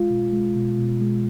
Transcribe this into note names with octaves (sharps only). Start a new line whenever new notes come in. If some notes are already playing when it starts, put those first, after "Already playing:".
Already playing: G#3 F4
B2
G#3
B2
B2
G#3